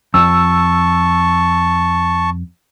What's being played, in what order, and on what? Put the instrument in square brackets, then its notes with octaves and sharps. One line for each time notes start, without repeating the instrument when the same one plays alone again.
[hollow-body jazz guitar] F2 [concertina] A5 C#6 [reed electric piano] E6